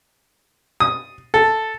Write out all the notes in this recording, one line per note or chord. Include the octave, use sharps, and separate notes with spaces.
D#6
A4